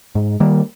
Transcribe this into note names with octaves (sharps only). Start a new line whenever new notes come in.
G#2
D#3 G3 A#3